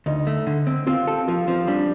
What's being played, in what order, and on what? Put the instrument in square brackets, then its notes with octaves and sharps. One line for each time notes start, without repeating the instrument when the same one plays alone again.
[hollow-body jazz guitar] D2 [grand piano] D#4
[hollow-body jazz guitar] A3
D3
C4
[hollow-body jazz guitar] C4 [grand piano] F4
[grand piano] G4 [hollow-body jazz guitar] A4
[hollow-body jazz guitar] F3 [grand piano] F4
[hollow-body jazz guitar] F3 [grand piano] C4
[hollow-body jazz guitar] G3 [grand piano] D4